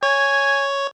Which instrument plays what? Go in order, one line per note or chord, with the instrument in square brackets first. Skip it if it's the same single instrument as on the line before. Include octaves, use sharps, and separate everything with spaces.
[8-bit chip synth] C#5 [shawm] G#5